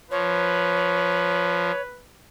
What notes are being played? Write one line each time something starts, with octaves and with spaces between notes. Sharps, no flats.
F3 B4 C#5